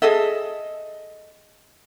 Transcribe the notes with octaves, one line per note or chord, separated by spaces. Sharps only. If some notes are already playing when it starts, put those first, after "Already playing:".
G#4 A4 D#5 E5